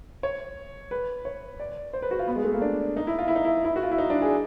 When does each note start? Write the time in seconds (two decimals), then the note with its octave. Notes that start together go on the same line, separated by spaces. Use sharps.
0.23 C#5
0.91 B4
1.25 C#5
1.60 D5
1.93 C5
2.02 B4
2.11 F#4
2.19 F4
2.27 B3
2.36 G#3
2.44 A3
2.53 A#3
2.61 D4
2.97 D#4
3.07 E4
3.19 F4
3.28 E4
3.36 D#4
3.45 E4
3.64 E4
3.76 F#4
3.83 F4
3.91 E4
3.98 D#4
4.10 D4
4.22 G#4